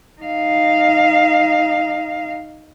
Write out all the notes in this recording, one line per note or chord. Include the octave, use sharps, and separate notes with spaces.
D#4 F5